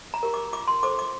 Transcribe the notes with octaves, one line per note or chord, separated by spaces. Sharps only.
A#5
G4 A#4
D6
F4 D6
C6
A4 C5 D6
D6